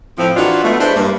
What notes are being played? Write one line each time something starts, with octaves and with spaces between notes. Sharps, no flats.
A2 F3 C4
E3 F#3 D4 D#4 F4 F#4
B2 A3
G#3 D4 E4 B4 C5
G2 A#3